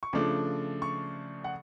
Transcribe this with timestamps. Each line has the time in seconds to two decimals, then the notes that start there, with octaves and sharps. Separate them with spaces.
0.03 C#6
0.13 C#3 F3 A3 D4 D6
0.82 C#6
1.44 F#5